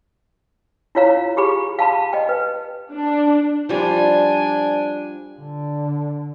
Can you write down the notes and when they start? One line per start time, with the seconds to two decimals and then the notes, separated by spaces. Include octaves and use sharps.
0.95 E4 F4 C#5 F5 A#5
1.37 G4 G#4 B5
1.79 F5 A5 B5
2.13 D#5 G5
2.29 B4
2.92 D4
3.69 F3 G3 D4 G#5
5.39 D3